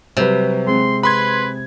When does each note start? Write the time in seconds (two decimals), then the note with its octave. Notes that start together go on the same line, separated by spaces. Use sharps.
0.17 C3 F#3 G3 B4
0.67 G#3 C4 C6
1.03 B4 B5 C6 G#6